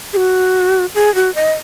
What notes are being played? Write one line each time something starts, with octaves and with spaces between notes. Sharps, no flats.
G#4
F#4
G#4
F#4
D#5